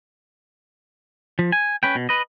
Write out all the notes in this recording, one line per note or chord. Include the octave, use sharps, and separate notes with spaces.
F3
G#5
C#4 B4 G5
B2
B4 D#5